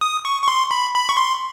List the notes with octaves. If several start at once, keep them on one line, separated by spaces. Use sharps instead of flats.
D#6
C#6
C#6
C6
B5
B5
C#6
C6